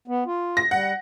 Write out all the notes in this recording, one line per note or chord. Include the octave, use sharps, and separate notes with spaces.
B3
F4
A#6
G3 F#5